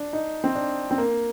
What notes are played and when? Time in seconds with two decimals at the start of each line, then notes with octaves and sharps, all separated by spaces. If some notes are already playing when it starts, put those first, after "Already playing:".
Already playing: D4
0.13 D#4
0.44 C4
0.55 D4
0.91 C4
0.98 A#3